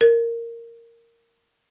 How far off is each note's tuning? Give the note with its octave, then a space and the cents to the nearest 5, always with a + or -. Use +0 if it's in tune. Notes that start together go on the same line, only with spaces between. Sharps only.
A#4 -10